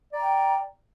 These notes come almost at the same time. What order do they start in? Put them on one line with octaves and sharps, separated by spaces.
D5 A#5 G5